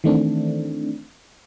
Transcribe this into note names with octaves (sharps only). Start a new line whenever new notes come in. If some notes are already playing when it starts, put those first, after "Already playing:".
D#3 E3 A3 C4 D4